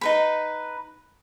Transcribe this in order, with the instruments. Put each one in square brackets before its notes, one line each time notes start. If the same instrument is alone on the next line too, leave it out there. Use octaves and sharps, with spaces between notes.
[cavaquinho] D#4 B4 B5